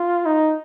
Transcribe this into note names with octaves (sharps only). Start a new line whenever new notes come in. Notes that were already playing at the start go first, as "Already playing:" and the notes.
Already playing: F4
D#4